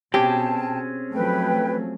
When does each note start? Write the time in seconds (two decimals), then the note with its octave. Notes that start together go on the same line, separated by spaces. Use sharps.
0.14 B2 C4 C#4 G4 G#4 G5 A5
1.14 F3 F#3 A3 B4 G5